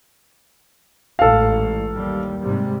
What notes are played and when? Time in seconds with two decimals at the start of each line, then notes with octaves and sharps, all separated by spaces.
1.19 A1 G#2 A4 F5
1.92 D#2 G3
2.43 G#2 C3 G3